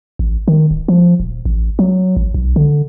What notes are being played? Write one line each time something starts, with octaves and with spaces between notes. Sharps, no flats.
A1
D#3
D1
F3
D#1
A1
F#3
A1
B1
D3